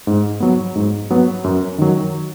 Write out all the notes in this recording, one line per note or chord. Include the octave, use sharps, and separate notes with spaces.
G#2
F#3 B3
G#2
F#3 B3
F#2
D#3 F#3